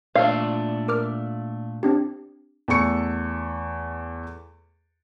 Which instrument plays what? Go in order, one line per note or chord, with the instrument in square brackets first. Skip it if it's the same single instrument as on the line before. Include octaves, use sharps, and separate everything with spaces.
[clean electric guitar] A#2 A3 D4 [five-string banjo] F5
[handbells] A#4 D6 F6
C4 D4 G4
[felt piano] E2 A3 A4 C#6 C#7